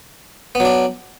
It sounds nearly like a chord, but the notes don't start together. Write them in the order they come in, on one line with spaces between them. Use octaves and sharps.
B3 F#3 D4